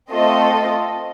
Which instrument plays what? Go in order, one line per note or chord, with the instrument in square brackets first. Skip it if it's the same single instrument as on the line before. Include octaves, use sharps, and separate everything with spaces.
[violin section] A3 C4 F4 A4 D#5